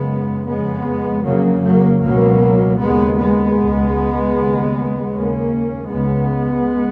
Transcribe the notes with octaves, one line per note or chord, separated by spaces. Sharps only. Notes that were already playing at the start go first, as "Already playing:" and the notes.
Already playing: F#2 C#3 G#3 B3
F2 C#3 G#3 B3
F2 C#3 F#3 A#3
F#3 A#3
C#2 B2 F#3 A#3
D#2 C#3 G#3 B3
G#3 B3
C#2 B2
D#2 C#3
D#2 C#3 A#3 C#4
C#2 C#3 G#3 B3